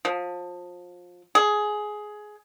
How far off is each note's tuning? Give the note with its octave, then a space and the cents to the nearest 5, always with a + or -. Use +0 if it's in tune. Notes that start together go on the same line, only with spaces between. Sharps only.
F3 +25
G#4 +15